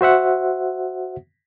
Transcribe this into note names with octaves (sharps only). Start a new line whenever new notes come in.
F#4 C5 E5 F#5